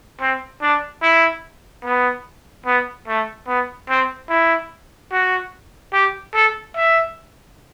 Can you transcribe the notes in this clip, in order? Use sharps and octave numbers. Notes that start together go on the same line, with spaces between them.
C4
D4
E4
B3
B3
A3
B3
C4
E4
F#4
G4
A4
E5